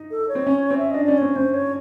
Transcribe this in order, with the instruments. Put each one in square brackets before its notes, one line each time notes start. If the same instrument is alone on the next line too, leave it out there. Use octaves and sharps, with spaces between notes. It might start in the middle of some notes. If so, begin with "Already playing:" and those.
Already playing: [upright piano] D#4
[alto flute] A4
C#5
[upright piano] C4
C#4
C4
[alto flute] E5
[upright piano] D4 [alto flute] D#5
[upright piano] C#4 [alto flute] D5
[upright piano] C4 [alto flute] C#5
[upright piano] C#4 [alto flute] C5
[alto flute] C#5